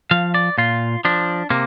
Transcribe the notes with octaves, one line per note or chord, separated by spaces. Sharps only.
F3 F5
D5
A#2 F4
F3 D4
C3 A#3